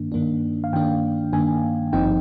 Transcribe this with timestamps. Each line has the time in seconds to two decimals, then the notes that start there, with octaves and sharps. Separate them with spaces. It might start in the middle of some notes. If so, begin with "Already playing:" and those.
Already playing: G2 D#3 A#3 D4
0.12 G2 D#3 A#3 D4
0.64 F5
0.73 G2 D#3 A#3 D4 G5
1.33 G2 D#3 A#3 D4 G#5
1.93 G#1 G2 F3 C4 D#4 G5